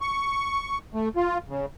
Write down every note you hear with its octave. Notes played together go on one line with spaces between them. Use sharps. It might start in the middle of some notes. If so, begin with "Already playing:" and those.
C#6
A3
F4
C#3